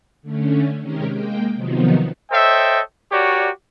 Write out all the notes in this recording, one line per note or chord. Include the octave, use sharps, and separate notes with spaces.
D3 A3 C#4
C3 D#3 G#3 C#4 G4 A#4
G#3 A#3 G5
C3 D#3 F3 F#3 B3 D#4
A4 C5 C#5 D#5 E5 G5
F#4 G4 A#4 C#5 D5